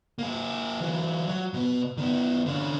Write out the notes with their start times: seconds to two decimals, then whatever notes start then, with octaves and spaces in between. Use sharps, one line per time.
0.19 A#3 G#4
0.80 E3 F#3
1.29 F#3
1.54 B2 B3
1.97 D#3 B3
2.46 D3 C#4